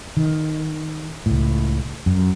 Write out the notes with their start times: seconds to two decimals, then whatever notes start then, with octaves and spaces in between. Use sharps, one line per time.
0.17 D#3
1.26 C#2 A2
2.06 F#2